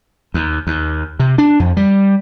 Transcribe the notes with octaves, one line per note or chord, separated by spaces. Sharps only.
D#2
D#2
C3
D4
F2
G3